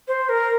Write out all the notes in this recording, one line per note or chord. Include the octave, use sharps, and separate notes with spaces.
C5
A#4